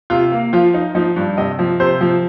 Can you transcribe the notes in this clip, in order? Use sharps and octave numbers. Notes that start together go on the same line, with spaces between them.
C3 F4
A#3
F3 F4
D#4
F3 D#4
G2
C3 D#5
F3
C3 C5
F3